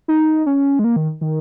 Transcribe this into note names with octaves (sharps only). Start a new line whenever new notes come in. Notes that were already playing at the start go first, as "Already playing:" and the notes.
D#4
C#4
G#3
A#3
D#3
D#3